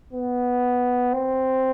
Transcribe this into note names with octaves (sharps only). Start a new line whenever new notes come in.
B3
C4